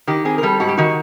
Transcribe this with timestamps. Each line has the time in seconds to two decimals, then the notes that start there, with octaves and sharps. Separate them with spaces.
0.07 D#3 G4
0.25 C4 G#4
0.38 A#4
0.43 G3 A4
0.60 G#2 F#4
0.68 G4
0.77 D#3 F#4